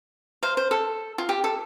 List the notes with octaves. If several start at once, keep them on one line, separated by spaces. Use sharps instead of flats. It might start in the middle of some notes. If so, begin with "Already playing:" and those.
C5 F5
C5
A4
F4
G4
A4